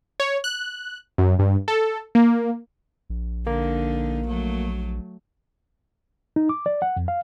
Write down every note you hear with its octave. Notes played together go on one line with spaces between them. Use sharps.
C#5
F#6
F#2
G2
A4
A#3
A#1
D3 A#3 D#4
F#3 A3
D#4
D6
D5
F#5
F2
F5